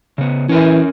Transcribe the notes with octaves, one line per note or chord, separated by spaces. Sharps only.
C#3 B3
E3 C#4 A#4 G#5